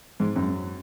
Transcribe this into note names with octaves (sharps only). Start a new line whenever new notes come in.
G#2
F#2